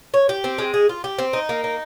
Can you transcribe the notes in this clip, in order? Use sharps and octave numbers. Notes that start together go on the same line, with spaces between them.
C#5
G4
C4
G#3
G#4
F4
G4
C4
D#4
A#3
D#4